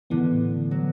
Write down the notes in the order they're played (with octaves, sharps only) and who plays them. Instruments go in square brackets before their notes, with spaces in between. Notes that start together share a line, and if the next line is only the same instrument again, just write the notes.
[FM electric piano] A2 E3 B3 [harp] D3
[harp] F#3